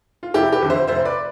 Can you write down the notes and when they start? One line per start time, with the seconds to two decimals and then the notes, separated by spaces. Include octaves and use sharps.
0.23 F4
0.34 F1 E4 G4
0.52 G4 B4
0.62 F2 D3
0.70 C5 E5
0.88 F1 C5 E5
1.05 B4 D5